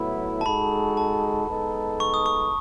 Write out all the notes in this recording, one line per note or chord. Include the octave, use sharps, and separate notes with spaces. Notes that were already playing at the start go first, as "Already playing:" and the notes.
Already playing: A2 F#3 B3 E4
A5
G#3 D#4 F#4 A4 B5
A5
G#3 B3 D#4 A4
C#6
D#6
C#6